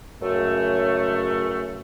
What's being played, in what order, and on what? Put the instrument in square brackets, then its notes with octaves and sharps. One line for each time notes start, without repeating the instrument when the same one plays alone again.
[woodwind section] C#2 F#2 A3